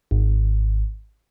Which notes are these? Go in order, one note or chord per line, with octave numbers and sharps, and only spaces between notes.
G#1